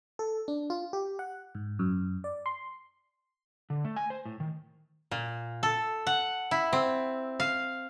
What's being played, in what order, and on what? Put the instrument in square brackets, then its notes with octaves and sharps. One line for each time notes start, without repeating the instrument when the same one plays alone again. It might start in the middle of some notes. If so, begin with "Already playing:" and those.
[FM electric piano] A4
D4
F4
G4
F#5
G#2
F#2
D5
C6
[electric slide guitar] D3
A3
G#5
C5
A2
D#3
[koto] A#2
A4
F#5
E4
C4
F5